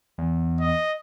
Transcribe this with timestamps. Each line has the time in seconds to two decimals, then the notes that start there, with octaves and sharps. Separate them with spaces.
0.18 E2
0.61 D#5